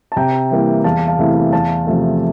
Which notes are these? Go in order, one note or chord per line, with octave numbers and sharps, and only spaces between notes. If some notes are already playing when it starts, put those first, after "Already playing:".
A5
C3 G5 A#5
E3 G3 A#3 E4
E2 F5 A5
F5 A5
C3 E3 A3 E4
E2 F5 A5
C3 F3 A3